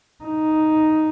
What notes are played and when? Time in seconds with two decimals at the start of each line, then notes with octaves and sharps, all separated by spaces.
0.24 D#4